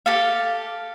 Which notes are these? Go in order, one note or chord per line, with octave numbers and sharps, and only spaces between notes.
G4 A4 F5